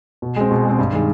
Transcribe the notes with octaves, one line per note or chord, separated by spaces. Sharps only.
B2
G#3 C4
B2
G#3 C4
G2
D#3 G#3